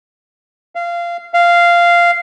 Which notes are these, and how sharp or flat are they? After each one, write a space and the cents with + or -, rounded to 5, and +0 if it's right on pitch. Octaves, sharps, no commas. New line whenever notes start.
F5 -20
F5 -10